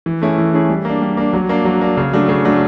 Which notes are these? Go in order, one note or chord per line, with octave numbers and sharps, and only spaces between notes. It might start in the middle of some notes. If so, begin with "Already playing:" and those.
E3
A3 C#4 E4 G#4
E3
A3 C#4 E4 G#4
G3
A#3 D4
G3
A#3 D4
F#3
A#3 D4
F#3
A#3 D4
C#3
F#3 A3 D4
C#3
F#3 A3 D4